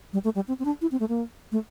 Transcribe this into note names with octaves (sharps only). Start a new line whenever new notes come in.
G3
A3
G3
C4
C4
D4
E4
C4
A3
A#3
A3